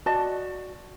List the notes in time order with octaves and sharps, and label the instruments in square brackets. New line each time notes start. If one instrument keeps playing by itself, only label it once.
[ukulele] F#4 D5 D#5 A5